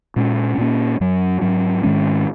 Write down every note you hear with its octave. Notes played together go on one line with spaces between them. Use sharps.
A#2 G#3 C#4
A#2 A#3 C#4
F#2 F#3 C#4
G#2 F#3 C#4
G#2 D#3 G#3 C#4